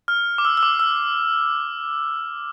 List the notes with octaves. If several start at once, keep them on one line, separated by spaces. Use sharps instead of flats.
F6
D6
E6
E6
D6
E6